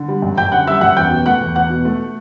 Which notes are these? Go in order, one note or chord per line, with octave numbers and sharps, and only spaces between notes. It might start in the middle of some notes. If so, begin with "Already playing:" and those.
Already playing: D3
G3
F#2
F#2 G5 G6
D3 F#5 F#6
G3 E5 E6
F#2 F#5 F#6
E2 G5 G6
B2
A3 F#5 F#6
E2
E2 F#5 F#6
B2
A3